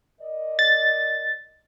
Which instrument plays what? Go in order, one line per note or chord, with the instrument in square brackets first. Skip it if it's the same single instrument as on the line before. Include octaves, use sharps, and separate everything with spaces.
[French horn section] A#4 D5 D#5
[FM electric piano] A6